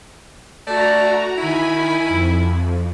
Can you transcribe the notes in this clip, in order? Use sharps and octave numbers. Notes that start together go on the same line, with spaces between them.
A3 D4 F#4 D5 A#5
D#3 E4 G#5 B5
F2